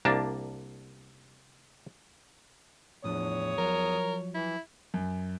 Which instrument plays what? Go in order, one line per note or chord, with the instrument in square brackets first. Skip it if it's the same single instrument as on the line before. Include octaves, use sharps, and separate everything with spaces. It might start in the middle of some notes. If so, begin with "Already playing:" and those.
[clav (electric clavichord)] C2 A#3 D4 A5
[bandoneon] E2 D#6 [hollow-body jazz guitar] A2 F3 D4 [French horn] C#5
[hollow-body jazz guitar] F3 F#3 [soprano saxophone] A#4
[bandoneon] E3 [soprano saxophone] E4
[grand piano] F#2